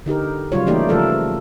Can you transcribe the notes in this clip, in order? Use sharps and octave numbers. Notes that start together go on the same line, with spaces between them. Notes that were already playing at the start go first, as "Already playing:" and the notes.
D3 D#4 G4 A#4
C#3 F#3 G3 F4 C#5
E3 A3 A#3 D#4 G4 D5
C#3 F3 A3 A4 A#4